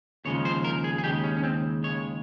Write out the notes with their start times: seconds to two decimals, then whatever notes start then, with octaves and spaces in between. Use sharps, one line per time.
0.25 D#2 C#3 F3 G#3 C#5
0.45 C5
0.64 A#4
0.84 G#4
0.98 G#4
1.04 D#2 C#3 G#3 G4
1.24 C#4
1.37 C#4
1.43 C4
1.84 D#2 C#3 G#3 C#5